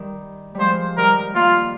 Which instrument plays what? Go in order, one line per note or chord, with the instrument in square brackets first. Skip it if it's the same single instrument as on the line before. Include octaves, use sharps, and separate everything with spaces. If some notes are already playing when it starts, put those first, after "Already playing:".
Already playing: [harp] D#3 G3
[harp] F3 G3 G#3 [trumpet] C5
[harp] D#3 G3 [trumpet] A#4
[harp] G3 A#3 [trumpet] F4